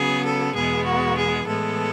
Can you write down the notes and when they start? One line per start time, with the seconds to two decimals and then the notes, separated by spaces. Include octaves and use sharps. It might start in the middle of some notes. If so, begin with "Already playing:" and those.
Already playing: C#3 F#3 B3 G#4
0.24 A4
0.55 E2 B2 G#3 B3 G#4
0.86 F#4
1.16 G#4
1.46 A2 E3 G#3 B3 A4